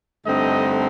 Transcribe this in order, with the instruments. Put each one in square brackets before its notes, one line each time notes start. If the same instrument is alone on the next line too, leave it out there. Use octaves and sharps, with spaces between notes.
[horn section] G2 D3 A3 C4 D#4 D#5